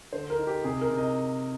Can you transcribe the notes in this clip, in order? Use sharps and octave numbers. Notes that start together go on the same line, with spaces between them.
D3 C5
A#4
D#4
G4
C3 G#4
A#4
C3
D#5